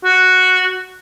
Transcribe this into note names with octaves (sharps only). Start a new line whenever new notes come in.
F#4